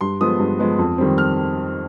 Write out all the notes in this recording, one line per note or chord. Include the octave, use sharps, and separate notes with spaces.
G2 C6
F3 G#3 B3 D#6
G2
F3 G#3 B3
F2
D#3 G3 C4
F6